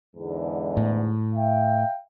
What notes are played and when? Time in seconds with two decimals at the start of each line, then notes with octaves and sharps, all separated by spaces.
0.16 E2 G#2 D3
0.77 A2
1.35 E5 F5 G5